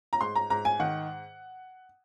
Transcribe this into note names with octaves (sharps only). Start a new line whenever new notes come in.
A#5
G#2 C6
A#5
G#2 A#5
G#5
D#3 F#5